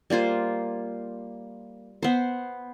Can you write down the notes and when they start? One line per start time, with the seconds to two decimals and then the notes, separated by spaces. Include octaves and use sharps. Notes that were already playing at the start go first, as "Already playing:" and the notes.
0.10 G3 A#3 F4 C5
2.03 B3 C5